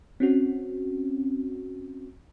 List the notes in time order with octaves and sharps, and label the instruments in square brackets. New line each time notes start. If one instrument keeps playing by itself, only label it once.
[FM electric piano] C4 C#4 F#4